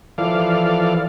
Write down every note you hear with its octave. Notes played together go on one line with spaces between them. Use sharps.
E3 F3 A4 D5 F5